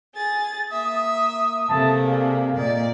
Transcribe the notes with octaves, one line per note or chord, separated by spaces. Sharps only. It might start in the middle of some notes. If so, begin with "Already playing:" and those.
G#4 A6
A#3 E5 D#6
C3 A3 A#3 E5 A5
G#4 D5 F5
A#2 A#3 D5 D#5